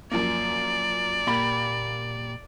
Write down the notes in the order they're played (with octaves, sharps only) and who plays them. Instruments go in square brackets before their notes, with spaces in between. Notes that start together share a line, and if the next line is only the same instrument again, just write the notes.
[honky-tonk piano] F#2 F3 A#3 [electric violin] D5
[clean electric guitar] A#2 G4 B5 [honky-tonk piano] A#3